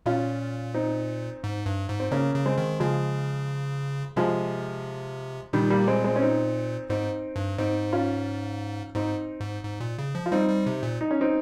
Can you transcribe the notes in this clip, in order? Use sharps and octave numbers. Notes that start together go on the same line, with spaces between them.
A#2 C#4 F4
C4 D#4
G#2
G2
G#2
C4
C#3 A#3 C#4
C#3
G#3 C4
D#3
C#3 F3 G#3
C3 F3 G#3
A#2 D#3 G3
G3 A#3
G#3 C4
G#3 C4
C#4
C4 D#4
G#2 C4 D#4
G2
G#2 C4 D#4
C#4 F4
G#2 C4 D#4
G#2
G#2
A#2
C#3
F3
F4
G3 C4 D#4
G3
C3
A#2
D#4
C#4
C4 D#4